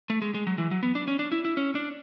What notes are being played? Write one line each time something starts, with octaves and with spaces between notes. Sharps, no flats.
A3
G#3
G#3
F#3
E3
F#3
B3
D4
C#4
D4
E4
E4
C#4
D4